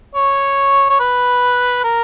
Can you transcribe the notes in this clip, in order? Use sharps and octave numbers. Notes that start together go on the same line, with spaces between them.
C#5
C#5
B4
A#4